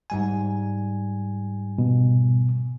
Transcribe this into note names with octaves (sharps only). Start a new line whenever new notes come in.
G#2 G3 G#5
B2